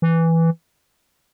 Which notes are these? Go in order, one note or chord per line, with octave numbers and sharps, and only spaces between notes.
E3